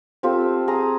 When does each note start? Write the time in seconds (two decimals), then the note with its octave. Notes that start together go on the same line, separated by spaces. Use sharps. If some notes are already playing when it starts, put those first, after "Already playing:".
0.23 C4 F4 G4 A4
0.68 G#4 A#5 D#6